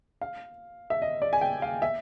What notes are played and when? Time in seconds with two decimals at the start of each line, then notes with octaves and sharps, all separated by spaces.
0.21 F5
0.90 E5
1.02 D#5
1.22 D5
1.33 G#5
1.41 G5
1.62 F5
1.82 E5